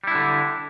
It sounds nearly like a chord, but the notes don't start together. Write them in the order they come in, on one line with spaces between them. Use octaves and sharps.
G3 E4 D4 D3